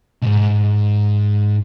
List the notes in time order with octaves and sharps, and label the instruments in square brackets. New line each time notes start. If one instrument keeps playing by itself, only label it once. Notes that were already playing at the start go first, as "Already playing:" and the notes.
[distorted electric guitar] B1 G#2